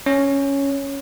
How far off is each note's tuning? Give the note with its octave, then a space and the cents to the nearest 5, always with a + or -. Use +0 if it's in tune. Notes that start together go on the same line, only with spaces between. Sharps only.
C#4 +0 C#5 +0